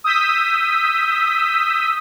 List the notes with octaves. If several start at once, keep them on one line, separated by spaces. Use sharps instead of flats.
D#6 E6 G6 B6